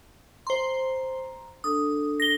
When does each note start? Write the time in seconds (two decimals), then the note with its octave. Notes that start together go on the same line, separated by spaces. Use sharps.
0.47 C5 A#5 C6
1.64 D4 A4 D#6
2.20 A#6 G7